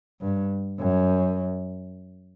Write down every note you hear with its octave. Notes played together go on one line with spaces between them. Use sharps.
G2
F#2